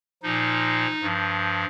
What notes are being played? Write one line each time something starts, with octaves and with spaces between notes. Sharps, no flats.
A#2 F3 D#4
G2 F3